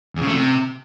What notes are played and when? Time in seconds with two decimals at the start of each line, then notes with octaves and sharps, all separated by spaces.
0.16 E2
0.21 C#3
0.27 A3
0.33 C3